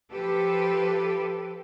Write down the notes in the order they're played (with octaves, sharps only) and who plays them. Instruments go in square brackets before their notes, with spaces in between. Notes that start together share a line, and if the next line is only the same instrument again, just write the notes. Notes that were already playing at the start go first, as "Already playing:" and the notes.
[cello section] F3 G4 A4 B4